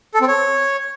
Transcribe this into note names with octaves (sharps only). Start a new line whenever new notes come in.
A4
C4
C#5